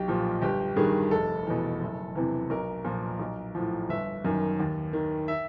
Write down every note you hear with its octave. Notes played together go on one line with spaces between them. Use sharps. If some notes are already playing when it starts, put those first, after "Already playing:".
Already playing: B1 G4
A#2 F3
G1 G4
G2 D#3 G#4
F1 A4
E2 B2
F#1
E2 C3 E3
B1 A#4
A#2 F3
B1
A2 F3
G1 E5
F#2 D#3
D#2
D#3
E5